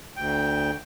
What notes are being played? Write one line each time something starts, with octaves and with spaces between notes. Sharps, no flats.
D2 G5